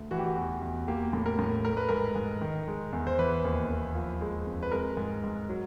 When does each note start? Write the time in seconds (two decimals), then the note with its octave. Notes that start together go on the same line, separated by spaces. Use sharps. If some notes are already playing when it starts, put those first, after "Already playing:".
Already playing: D2
0.11 E3 F#4
0.19 G4
0.26 F#4
0.37 E2
0.62 E2
0.88 A#3 G4
1.13 A2
1.26 A#4
1.39 A2
1.64 A3 A#4
1.77 B4
1.89 G#2 A#4
2.16 G#2
2.41 D#3
2.68 G#3
2.93 E2
3.07 C5
3.18 E3 B4
3.45 D#2
3.69 D#2
3.95 F3
4.21 G#3
4.46 F2
4.63 B4
4.72 G#3 A#4
4.97 G#2
5.24 G#2
5.49 F#3